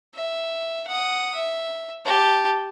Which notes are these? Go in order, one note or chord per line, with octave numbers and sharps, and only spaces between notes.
E5
F#5 D#6
E5
G4 A5